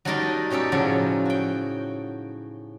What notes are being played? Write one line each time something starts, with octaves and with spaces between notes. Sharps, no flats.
F#3 G3 A3 D#4 A#4 D5
B2 C#4 G4 A4 G5
A2 C#3 F3 F#3
F#4 G5